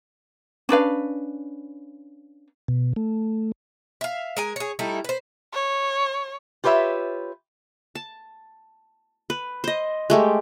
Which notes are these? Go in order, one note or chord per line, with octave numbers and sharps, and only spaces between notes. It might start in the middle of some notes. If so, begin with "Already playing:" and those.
C#4 D4 B4 F5
B2
A3
E5 F5
G#3 A#4 G#5
G#4 C#5
G3 A3 D#4 E4
B4 C5
C#5
F4 G4 B4 C#5 E5
A5
B4
C5 D#5
G#3 A3 G4